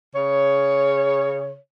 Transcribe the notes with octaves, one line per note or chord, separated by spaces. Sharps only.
C#3 C#5